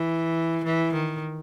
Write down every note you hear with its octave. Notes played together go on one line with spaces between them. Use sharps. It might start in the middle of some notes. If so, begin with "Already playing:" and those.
Already playing: E3
E3
D#3